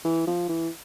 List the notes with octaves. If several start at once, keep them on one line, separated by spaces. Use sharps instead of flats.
E3
F3
E3